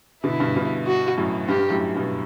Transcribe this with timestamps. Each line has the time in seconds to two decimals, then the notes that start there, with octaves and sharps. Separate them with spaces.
0.24 B2 D3 E4
0.40 G2 B2
0.56 G2 B2
0.87 F#4
1.17 F#2 A2
1.48 G2 G4
1.59 G2
1.70 F#2 A2
1.95 G2 B2